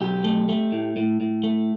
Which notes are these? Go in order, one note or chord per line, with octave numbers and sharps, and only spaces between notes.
B1 G4
A3
A3
A2
A2
A2
A3